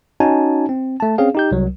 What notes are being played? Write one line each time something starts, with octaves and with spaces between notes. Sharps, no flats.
C#4 D#4 F#4 G#5 A5
C4
A3 A5
C4 C#4 G#4 F5
D#4 G4 G6
C2 F#3